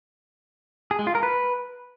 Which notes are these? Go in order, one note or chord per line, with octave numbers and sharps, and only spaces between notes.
G#4
G#3
F4
A#4
B4